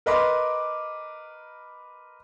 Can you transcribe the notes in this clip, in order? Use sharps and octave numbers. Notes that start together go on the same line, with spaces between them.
A#4 B4 D#5 B5 C6 D6